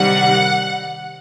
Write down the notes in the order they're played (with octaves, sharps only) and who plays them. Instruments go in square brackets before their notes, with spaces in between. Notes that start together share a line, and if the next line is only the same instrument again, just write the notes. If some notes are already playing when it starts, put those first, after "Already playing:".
Already playing: [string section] C3 D#3 G3 F#5